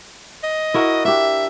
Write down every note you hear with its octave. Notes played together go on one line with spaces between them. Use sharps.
D#5
E4 F#4 A#4
D4 G4 E5